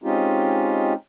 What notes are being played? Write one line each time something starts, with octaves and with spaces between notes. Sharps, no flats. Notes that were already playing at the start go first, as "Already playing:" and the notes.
G#3 C4 C#4 D#4 F4 G4